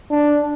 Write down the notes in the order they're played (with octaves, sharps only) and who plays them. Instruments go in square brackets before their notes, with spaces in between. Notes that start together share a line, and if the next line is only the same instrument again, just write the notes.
[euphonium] D4